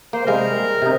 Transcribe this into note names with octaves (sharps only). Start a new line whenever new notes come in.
A#3 C5
C3 G3 G#3 A#4
C3 D#4